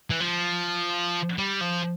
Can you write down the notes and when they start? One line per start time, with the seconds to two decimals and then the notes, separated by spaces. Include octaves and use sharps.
0.10 E3
0.20 F3
1.38 G3
1.61 F3